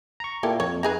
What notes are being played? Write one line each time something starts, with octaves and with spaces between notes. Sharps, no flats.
A#5 C#6
A#2 A#3 E4 G4 A4
F2 C#5
D#4 G#4 B4 A#5